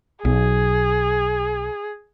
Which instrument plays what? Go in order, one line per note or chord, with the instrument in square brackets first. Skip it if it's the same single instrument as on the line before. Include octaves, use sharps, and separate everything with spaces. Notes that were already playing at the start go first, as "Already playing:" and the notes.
[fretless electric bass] B1 [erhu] G#4